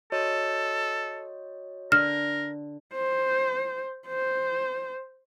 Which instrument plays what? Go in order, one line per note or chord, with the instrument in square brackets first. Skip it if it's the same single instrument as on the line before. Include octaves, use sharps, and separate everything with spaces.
[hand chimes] F#4 C#5 D#5 [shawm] A4
[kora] D3 [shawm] A#4 [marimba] F6
[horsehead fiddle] C5
C5